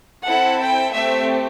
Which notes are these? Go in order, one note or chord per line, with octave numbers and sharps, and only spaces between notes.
C4 E4 A4 F#5
G5
A3 C4 G4 E5